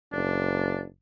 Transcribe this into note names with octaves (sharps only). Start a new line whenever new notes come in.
F#1 D4